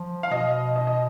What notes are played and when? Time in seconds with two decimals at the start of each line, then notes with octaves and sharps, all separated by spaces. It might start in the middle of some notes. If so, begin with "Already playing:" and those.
Already playing: F3
0.23 F5
0.31 B2 D#5
0.76 D#5
0.87 D#5